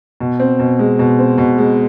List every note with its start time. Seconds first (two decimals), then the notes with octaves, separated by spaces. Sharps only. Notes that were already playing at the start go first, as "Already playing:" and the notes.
0.20 B2
0.40 C4
0.59 B2
0.79 G#3
0.99 B2
1.19 C4
1.38 B2
1.58 G#3